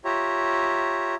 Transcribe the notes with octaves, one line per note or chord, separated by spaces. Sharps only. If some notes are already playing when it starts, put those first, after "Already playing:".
F4 G4 C#5 E5 A#5